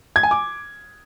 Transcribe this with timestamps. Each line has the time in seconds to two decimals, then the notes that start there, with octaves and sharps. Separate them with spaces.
0.16 G#6
0.23 G#5
0.31 D6